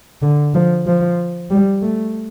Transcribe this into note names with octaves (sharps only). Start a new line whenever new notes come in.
D3
F3
F3
G3
A3